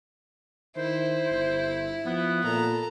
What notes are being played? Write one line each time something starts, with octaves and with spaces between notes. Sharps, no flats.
D#3 E4 C5
G1
F3 B3
A#2 A4 A#5